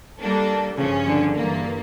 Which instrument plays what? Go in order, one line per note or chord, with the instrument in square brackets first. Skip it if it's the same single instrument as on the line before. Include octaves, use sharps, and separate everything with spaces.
[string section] G3 A#3 D4 A4
[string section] G2 F3 C#4 [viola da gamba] C#3
[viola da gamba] D3
[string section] G2 E3 A#3